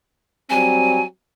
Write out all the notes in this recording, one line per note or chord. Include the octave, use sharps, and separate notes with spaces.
F#3 G3 C4 G#5